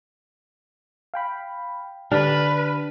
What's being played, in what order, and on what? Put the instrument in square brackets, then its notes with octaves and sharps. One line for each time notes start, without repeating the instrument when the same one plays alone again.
[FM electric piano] F5 G5 B5
[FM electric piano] D3 G4 F6 [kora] D4 [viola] B4